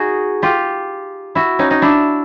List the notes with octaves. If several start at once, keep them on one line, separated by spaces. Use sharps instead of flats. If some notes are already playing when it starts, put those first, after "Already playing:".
Already playing: D#4 F#4 G#4
F4 G4
E4 F#4
C#4 D#4
C#4 D#4
D4 E4